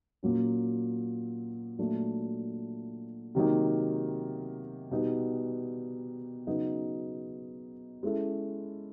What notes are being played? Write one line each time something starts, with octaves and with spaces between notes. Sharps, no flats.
A#2 F#3 A#3 C#4
A#2 F#3 A3 D4
C3 D#3 F#3 A#3 D#4
B2 G3 B3 D#4
C#3 F#3 B3 D#4 F#4
G#3 C#4 E4 A4